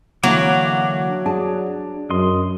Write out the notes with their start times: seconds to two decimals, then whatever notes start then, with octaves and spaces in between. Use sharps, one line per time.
0.23 D3 E3 F#3 A#3 D6
1.26 D4 G#4 A5
2.10 F#2 D#5 C6